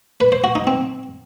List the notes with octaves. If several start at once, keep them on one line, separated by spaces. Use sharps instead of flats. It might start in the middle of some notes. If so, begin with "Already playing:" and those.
B4
C5
F#4
D#4
C4